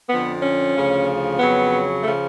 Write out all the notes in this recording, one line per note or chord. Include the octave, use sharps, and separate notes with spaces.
F2 D3 F3 B3
C#4
D2 C#3 F3
F2 C#3 F#3 B3
C#3 F3 A3